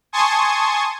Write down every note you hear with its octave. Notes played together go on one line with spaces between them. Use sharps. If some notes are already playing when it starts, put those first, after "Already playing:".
G#5 A5 C6 C#6 D#6 G#6